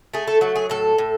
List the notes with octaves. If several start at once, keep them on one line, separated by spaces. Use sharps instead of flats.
A3 G#4
A4
F#3 F#4
G#4
A2 A4
A2